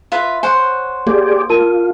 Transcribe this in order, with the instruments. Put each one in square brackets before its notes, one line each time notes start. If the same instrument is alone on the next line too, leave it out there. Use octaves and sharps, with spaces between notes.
[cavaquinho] F4 B4 E5
[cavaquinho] C5 C#5 F#5 [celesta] G#5
[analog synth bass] A#3 [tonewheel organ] G4 G#4 D5
[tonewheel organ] F4 [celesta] A#4 A5 D#7